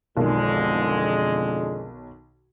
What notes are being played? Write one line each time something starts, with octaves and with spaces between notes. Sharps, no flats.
B1 F2 D3 D#3 G#3